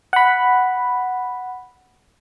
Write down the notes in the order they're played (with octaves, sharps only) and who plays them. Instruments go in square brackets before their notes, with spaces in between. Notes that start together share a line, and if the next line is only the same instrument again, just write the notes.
[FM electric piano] F#5 B5